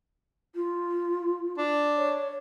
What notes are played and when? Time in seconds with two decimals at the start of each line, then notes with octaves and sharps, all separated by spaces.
0.55 F4
1.58 D4
1.97 C#5